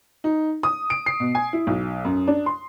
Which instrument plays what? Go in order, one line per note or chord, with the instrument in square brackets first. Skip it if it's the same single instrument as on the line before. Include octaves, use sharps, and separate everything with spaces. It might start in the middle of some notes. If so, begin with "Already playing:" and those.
[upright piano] D#4
D#6
D7
C7
B2
G#5
E4
B1
F#2
D4
C6